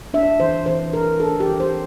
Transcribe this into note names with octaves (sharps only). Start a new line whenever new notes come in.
D4 E5
E3 C5
E3 C5
D4 A#4
D4 A4
G4
E3
C5